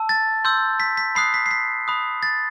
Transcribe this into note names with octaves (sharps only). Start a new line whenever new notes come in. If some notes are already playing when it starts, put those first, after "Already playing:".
Already playing: A5 E6
A6
C6 E6 G6
B6
B6
B5 D#6 F#6 C7
B6
C7
B6
B5 D#6 F#6
A6